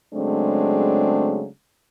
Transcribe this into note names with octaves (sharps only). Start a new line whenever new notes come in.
C#3 F#3 G#3 A3 C4 D4